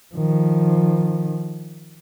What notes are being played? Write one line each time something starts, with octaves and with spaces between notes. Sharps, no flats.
D#3 F3